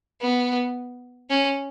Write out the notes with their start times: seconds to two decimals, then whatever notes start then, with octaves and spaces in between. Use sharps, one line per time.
0.21 B3
1.30 C#4